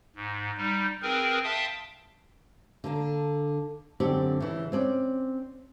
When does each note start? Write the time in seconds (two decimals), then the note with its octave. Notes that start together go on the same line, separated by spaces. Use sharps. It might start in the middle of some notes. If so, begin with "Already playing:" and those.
0.16 G#2
0.57 G3 D#4
1.02 C4 G#4 A#4 B4
1.44 E5 F5 G5 A5 C6 D#6
2.84 D3 A#3 D4
4.00 F#2 D3 C4 G4 D5
4.40 C#3 E3
4.72 C4 C#4 D5